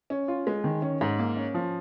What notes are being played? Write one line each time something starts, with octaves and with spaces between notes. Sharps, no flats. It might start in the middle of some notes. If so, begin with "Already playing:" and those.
C#4
F4
G#3
D#3
C#4
G#2
A#3
C#4
F3